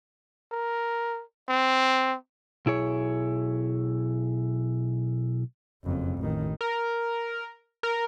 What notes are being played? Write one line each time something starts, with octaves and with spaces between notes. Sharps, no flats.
A#4
C4
B1 E4 G#4 C#5
F#1 F2
A1 D#3
A#4
A#4